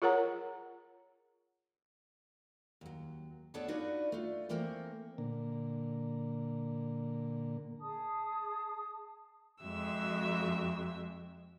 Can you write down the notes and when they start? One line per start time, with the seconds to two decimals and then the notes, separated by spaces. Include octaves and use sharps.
0.02 F4 G#4 A#4 C#5 F#5 A#5
2.81 D#2 F#3
3.54 D2 B3 D4 A4 C#5 A5
3.68 D4 D#4 F4 F#4 B4 D5
4.12 A3 F4
4.49 E3 A3 A#3 C4 A#4
5.18 A#2 D3 A#3
7.81 G#4 A5 D#6
9.64 F2 G#3 C4 F#4 E5 E6